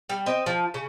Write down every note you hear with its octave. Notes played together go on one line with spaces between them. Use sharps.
G3
C4 D#5
F3
C#3